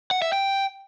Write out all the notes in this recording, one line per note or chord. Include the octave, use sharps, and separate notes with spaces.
F#5
E5
G5